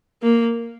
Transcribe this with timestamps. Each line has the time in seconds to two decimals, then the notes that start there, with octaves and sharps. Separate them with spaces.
0.22 A#3